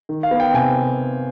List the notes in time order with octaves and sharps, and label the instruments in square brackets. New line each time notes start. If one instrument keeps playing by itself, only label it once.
[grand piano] D#3
F5
B3
G5
C3 G#5